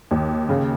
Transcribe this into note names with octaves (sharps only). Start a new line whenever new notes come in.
D#2
C#3